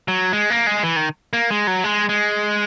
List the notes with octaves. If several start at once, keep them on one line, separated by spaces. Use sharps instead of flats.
F#3
G#3
A#3
G#3
E3
D#3
A#3
G#3
F#3
G#3
G#3